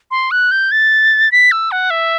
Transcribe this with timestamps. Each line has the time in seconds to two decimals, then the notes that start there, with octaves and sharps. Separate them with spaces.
0.11 C6
0.31 F#6
0.51 G6
0.71 A6
1.32 B6
1.52 E6
1.71 F#5
1.90 E5